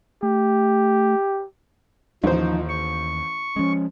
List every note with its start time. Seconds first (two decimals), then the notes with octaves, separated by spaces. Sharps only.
0.23 A3 G4
2.24 A1 D#2 F3 D#4 C5
2.69 C#6
3.56 F3 G#3 C#4